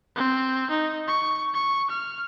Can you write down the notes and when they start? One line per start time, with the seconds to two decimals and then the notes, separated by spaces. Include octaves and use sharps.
0.16 C4
0.70 D#4
1.08 C#6
1.54 C#6
1.90 F6